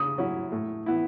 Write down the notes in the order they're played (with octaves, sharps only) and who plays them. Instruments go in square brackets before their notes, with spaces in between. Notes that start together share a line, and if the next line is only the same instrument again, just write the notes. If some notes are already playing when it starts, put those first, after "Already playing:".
Already playing: [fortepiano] C#3 [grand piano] D#6
[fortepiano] F#3 C#4 E4
A2
E3 B3 E4